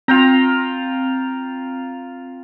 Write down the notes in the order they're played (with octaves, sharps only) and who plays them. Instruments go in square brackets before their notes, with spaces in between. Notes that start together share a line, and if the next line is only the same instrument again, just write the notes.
[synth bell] C4 F7 [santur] F4 G5 A#5